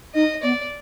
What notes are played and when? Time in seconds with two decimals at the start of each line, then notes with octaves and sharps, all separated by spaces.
0.14 D#4 D#5
0.43 B3 D5